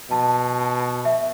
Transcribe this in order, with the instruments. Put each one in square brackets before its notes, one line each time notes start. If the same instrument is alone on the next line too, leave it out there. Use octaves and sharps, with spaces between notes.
[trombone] B2 [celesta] A5
[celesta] E5